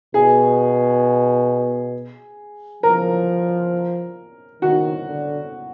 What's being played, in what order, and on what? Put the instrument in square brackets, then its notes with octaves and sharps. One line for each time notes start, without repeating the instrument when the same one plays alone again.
[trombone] B2 [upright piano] G#4
[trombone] F3 [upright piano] A#4
[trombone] D#3 [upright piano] F#4
[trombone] D3